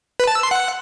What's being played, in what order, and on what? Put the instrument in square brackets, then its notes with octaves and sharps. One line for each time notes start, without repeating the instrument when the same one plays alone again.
[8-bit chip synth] B4
A5
E6
C6
F#5